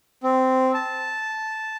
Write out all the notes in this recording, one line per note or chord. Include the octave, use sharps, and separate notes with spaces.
C4
A5